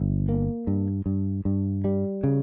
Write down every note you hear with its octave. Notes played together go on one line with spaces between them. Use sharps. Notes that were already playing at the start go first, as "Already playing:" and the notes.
Already playing: G1
A#3
G2
G2
G2
G3
C#3